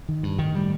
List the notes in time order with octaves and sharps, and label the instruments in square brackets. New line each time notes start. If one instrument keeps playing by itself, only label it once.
[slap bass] D#3
G2
[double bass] A2 [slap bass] D#3
[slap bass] G3